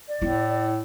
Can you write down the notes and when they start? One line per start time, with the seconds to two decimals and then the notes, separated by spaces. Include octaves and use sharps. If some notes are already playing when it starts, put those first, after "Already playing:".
0.08 D5
0.22 A2 E4